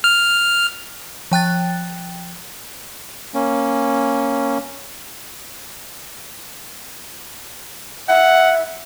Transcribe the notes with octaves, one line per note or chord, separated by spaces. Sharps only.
F6
F3 G5 F#6 A6
A#3 C#4
E5 F#5